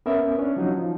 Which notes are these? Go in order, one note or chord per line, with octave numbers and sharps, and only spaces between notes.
B3 C#4 A#4 E5
C#4 D4
F3 F#3 D#4
F3